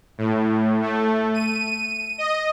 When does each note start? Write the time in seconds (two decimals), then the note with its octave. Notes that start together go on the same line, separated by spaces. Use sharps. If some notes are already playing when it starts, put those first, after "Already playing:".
0.18 A2
0.82 A3
1.34 D#7
2.18 D#5